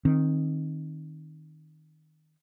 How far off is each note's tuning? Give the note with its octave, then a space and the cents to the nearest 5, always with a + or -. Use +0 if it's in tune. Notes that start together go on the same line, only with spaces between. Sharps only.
D#3 +0 C4 +30